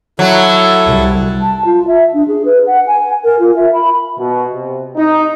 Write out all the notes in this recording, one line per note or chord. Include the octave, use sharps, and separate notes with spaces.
F#3 E4 A4
C2
A5
F4
E5
D4
G#4
B4
F#5
G#5
A#4
F4
E5
B5
B2
C3
D#4